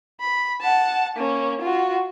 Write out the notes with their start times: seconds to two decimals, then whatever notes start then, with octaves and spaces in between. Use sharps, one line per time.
0.21 B5
0.62 F#5 A5
1.17 A#3 C#4
1.61 F4 F#4